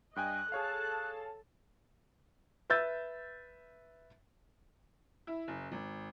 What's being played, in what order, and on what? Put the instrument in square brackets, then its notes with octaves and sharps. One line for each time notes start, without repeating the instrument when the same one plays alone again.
[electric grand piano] G2 G5 G#5 [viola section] D#5 [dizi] F#6
[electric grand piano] G#4 C#5 F5 [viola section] A4 A5
[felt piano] B4 E5 E6 G6 A6
[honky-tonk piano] E4
F#1
G#1